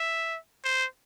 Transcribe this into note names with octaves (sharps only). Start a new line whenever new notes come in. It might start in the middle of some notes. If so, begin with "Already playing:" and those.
Already playing: E5
C5